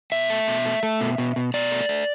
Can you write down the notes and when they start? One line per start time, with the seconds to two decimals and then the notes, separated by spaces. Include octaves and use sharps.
0.12 B2 E5
0.30 A3
0.48 B2
0.65 A3
0.83 A3
1.01 B2
1.18 B2
1.36 B2
1.54 B2 D5
1.71 A3
1.89 A3